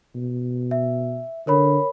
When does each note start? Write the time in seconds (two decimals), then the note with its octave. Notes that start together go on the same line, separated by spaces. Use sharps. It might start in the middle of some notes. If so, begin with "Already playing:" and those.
0.15 B2
0.71 E5
1.47 D3 A#4 C#5 B5